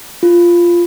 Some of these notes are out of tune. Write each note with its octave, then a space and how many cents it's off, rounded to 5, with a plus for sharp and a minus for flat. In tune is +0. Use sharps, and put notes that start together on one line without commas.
F4 -10